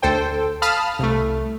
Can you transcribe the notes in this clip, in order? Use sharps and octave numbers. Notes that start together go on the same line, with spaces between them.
D2 A4 C5 G5
F5 A5 B5 D#6 F6
C2 A3